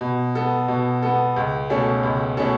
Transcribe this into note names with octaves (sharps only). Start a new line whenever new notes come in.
B2
B3 A4
B2
B3 A4
C#2
B2 A3 C#4 A4
C#2
B2 A3 C#4 A4